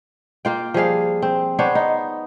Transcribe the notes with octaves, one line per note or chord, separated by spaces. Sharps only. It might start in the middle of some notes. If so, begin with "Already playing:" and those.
A#3 F4 G5
F3 G3 G#4 F5
C4
B3 D4 C5 C#5
D#4